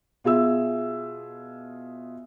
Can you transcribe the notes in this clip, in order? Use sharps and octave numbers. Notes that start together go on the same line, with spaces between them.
B2 F4 G#4 E5 E6